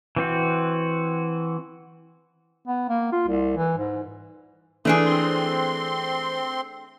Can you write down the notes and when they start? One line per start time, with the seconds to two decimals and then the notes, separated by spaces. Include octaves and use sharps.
0.16 E3 C4 F#4
2.67 B3
2.89 A#3
3.12 F4
3.28 C2
3.57 E3
3.78 G#2
4.85 E3 A3 D4 G#4 C6
5.05 C4 C6